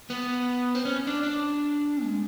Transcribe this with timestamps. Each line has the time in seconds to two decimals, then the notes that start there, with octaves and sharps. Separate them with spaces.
0.10 B3
0.75 C4
0.85 C#4
1.07 D4
1.23 D4
2.03 G#3